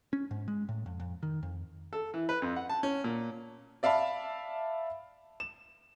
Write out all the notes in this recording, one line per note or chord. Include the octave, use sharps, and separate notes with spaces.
C#4
G#2
G#3
A2
F2
F2
D#3
F2
A4
E3
B4
F2
F#5
A5
C#4
A#2
D5 E5 F5 A5 B5
E7